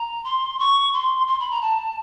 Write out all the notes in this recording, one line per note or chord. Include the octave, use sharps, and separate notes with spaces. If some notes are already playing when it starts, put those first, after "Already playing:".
Already playing: A#5
C6
C#6
C6
C6
B5
A#5
A5